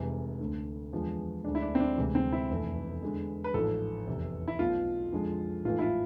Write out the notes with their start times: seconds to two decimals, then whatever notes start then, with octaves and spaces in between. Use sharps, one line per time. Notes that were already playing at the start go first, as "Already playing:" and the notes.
Already playing: F1 F2 C3 E3 G#3
0.39 D2 D3 A3
0.93 E2 D3 F3 G#3
1.44 D2 D3 G#3 D4
1.55 E4
1.62 D4
1.75 C4
1.80 D4
1.98 D2 C3 E3 G#3
2.15 C4
2.32 E4
2.50 F1 E2 B2 A3
3.03 E2 D3 G#3
3.44 B4
3.54 A1 G#2 F3 A4
4.07 F1 E2 C3
4.48 E4
4.59 B1 B2 A3 F4
5.12 F2 D3 F3 G#3
5.65 A1 G#2 E3 A3 F4
5.79 E4
5.82 F4